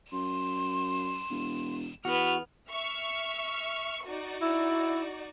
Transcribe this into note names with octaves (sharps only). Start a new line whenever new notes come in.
F#2 C6 E7
E1
E2 B3 F#4 F6
E5 C#6 F6
D#4 F#4 D5
E4